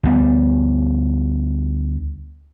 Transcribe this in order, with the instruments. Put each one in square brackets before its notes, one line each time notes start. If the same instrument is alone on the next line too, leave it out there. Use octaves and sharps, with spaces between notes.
[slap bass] D2 G3 B3